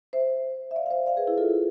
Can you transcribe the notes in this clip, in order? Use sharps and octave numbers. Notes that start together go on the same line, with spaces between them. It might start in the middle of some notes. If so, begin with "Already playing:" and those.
C5 E5
E5
D5 F5
F5
C5 E5
D5 F5
G#4 B4
E4 G#4
F4 A4